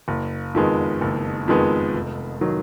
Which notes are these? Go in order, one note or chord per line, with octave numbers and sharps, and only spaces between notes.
F#1
F2 D#3 G#3 B3
F#1
F2 D#3 G#3 B3
F1
D#3 F#3